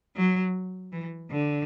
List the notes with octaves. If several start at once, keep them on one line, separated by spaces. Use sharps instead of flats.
F#3
E3
D3